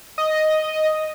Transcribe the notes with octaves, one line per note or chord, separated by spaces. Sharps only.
D#5